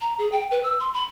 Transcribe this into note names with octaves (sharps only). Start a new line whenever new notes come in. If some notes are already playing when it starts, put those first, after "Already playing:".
A#5
G#4
G5
B4
E6
C6
B5